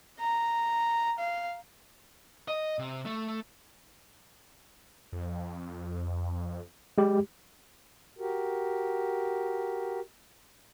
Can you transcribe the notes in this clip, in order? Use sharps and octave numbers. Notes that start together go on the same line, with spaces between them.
A#5
F5
D#5
C3
A3
F2
G#3 G4
F#4 G4 A#4